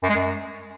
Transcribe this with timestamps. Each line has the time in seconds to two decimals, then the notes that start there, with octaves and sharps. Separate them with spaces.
0.03 F#2
0.10 G#3
0.16 F#2